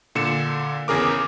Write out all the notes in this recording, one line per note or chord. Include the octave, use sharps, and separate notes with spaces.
A#2 D3 C#7 E7
E2 C#3 G#4 A#4 D6